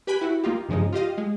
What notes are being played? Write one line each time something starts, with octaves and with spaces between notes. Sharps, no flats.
G4 B4 G5 G#5 B5
E4 F#4
A#3 D#4 F4 G4
G2 C#3 F3 G#3 D#4
F4 G4 D#5 F5
G#3